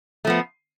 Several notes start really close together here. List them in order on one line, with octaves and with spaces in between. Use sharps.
A3 F3 B3